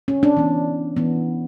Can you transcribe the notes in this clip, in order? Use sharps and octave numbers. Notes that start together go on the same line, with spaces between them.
C#4
D4
E3 B3
E3 B3